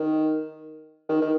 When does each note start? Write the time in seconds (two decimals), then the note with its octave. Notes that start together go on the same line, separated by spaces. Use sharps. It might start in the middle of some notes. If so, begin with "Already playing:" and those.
Already playing: D#3
1.09 D#3
1.21 D#3